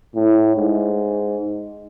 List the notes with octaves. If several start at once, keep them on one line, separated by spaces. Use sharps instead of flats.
A2
G#2